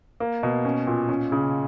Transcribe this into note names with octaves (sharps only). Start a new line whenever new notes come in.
A#3
B2
C#4
A#2
C#4
C#3